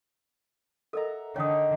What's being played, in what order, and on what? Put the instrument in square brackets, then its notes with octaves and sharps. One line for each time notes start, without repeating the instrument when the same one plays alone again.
[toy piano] A4 A#4 D#5 [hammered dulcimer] E5 F#5 A#5
[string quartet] D3 [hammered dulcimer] D#3 [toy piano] C#5 F5 D#6